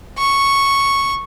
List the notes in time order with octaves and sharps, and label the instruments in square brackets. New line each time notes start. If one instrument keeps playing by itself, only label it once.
[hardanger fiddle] C#6